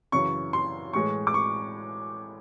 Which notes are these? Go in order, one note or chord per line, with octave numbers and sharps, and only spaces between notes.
F#2 C#3 E3 C#6
C6
A2 E3 G#3 C#6
D6
C#6